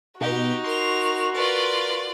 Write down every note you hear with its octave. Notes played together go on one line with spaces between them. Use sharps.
B2 D#4 F#4 G4
A#4 C6 F7
F4 A#4 B4 D5